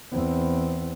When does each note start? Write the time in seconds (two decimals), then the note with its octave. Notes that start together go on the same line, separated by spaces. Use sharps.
0.12 E2 C4